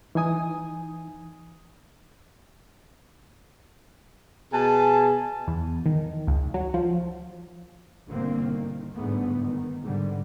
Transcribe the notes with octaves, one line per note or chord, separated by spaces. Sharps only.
E3 D#4 G#5 D#6
B2 G#4 G#5 A5
E2
D#3
C#2
F#3
F3
G1 B2 D3 A#3 C4
D#3
G1 G#2 D3 A3 B3
D#3
G#2 D3 G3